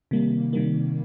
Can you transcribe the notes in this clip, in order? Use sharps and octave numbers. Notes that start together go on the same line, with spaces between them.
C3 D#3 G3 A#3
C3 D#3 G3 A#3